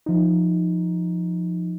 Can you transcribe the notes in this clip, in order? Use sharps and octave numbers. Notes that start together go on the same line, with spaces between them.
F3 D#4